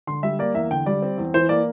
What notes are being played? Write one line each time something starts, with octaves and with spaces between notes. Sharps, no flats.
D3 C6
G3 E5
A#3 D5
E2 E5
D3 G5
G3 D5
C4
E2
E3 C5
A#3 D5